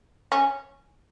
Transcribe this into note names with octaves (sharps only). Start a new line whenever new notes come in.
C#4